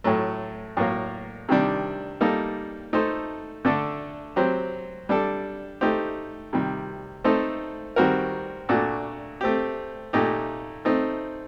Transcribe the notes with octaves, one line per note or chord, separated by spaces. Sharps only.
A2 F#3 A3
A2 F#3 A#3
C3 D#3 G3 D4
G3 A#3 D#4 A4
A3 D#4 A4 C5
D3 A3 D4 A4
F#3 C4 G4 C5
G3 D4 A4
A3 D#4 G4 C5
C3 D#3 G3
A3 C4 D#4 A4 C5
D#3 G3 C4 F#4 A#4
A#2 A3 D4 F#4
A3 C4 G4
A#2 A3 D#4 G4
A3 C4 D#4